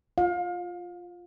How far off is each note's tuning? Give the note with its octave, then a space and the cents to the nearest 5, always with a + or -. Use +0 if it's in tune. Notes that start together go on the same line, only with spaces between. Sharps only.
F4 +0 F5 +30